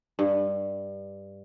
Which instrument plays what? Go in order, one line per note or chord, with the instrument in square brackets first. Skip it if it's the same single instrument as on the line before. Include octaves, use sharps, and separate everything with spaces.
[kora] G2